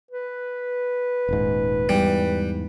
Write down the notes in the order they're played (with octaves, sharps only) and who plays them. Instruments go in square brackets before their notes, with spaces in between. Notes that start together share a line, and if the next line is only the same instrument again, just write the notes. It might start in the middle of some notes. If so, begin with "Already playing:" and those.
[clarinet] B4
[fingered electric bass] D#1 G#2
[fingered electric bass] E2 G#2 [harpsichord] G3